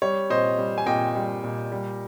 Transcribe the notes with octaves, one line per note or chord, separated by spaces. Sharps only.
G3 C#5
A#2 C5 D#5
G3
G#5
A#2 D#5 G5
G3
A#2
G3